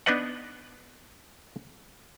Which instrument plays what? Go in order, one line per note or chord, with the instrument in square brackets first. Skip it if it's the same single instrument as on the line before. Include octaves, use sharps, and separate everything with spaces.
[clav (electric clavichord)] B3 D4 D#4 B4 D#5 F#5